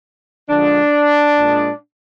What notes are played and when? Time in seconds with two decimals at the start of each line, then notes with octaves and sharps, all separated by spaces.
0.49 D3 F3 G#3 D4
1.38 A#2 G#3